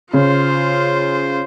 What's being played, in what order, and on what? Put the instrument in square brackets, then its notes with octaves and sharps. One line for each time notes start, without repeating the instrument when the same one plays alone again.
[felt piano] C#3 [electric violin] F4 C5